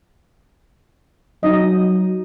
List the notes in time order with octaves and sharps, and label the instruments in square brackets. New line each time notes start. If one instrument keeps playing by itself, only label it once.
[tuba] F#3 [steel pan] D#4 D#5